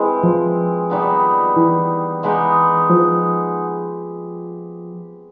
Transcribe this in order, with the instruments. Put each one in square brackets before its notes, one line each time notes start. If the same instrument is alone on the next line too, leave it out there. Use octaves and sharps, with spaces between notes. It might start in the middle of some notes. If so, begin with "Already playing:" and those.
Already playing: [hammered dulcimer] E3 G#3 C4
[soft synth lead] F3
[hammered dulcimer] D#3 G3 B3 D#4
[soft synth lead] E3
[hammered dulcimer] G#3 B3 D#4 G4
[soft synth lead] F3